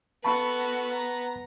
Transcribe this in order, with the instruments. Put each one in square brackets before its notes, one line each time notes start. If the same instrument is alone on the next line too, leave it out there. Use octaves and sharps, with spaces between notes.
[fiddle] B3 [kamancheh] F#4 A4 [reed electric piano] A5 B5 C#6
[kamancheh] A#5